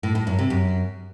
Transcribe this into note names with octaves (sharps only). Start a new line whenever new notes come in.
A2
A2
F#2
C3
F#2